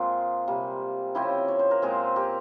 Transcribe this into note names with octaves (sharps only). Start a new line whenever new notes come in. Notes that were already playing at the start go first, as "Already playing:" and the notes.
Already playing: A#2 G#3 A#3 C4 F4 G#4 A#4
C3 G3 A#3
C#3 F3 C4 E4 G4
C#5
C5
A#4
A#2 G#3 C4 F4 G#4
G4 A#4